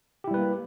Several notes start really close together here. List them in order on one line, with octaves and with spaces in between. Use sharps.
G4 E4 G3 B4 A#3